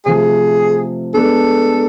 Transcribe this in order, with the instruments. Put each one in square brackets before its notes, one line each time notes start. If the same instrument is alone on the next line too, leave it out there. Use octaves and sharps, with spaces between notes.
[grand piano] C3 F3 A3 [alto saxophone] G#4
[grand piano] G#3 B3 D4 [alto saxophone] A4